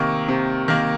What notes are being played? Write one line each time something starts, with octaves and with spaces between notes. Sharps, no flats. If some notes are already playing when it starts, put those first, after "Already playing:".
Already playing: C3 D#3 A#3 C#6
C3
D#3 A#3